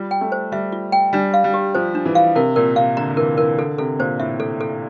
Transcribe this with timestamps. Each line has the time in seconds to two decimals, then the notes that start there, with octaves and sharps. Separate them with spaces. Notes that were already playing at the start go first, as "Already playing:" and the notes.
Already playing: G3 F4
0.11 G5
0.21 A3
0.32 C5
0.52 G3 E5
0.72 F4
0.92 G5
1.13 G3 D4
1.34 F5
1.44 G3
1.54 G4
1.75 F3 C5
1.95 D4
2.05 E3
2.15 F5
2.35 C3 A#4
2.56 A#2 A#4
2.76 C3 F5
2.97 D3 A#5
3.10 D3
3.17 E3 A#4
3.38 E3 A#4
3.58 D3 A4
3.78 C3 A4
3.99 A#2 C5
4.20 A2 E5
4.40 A4
4.61 A4